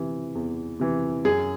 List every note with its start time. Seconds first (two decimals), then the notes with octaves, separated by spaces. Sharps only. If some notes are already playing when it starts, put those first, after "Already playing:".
Already playing: C3 E3
0.35 E2
0.80 C3 E3
1.25 F#2 G#4